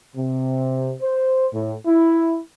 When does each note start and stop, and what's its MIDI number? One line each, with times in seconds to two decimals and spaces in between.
0.16 0.93 48
1.01 1.46 72
1.53 1.74 45
1.86 2.37 64